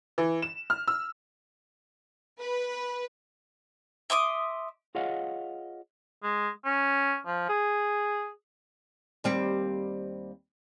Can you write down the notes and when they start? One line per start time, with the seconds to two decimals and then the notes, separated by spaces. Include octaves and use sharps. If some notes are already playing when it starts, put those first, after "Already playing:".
0.18 E3
0.42 E7
0.70 F6
0.88 E6
2.38 B4
4.10 E5 C6 D6 D#6
4.95 F4 G#4 C#5 D#5 F5 F#5
6.23 G#3
6.65 C#4
7.26 F3
7.49 G#4
9.24 D#2 G3 C4